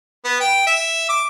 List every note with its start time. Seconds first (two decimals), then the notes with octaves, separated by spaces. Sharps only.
0.25 B3
0.40 G5
0.67 E5
1.09 D6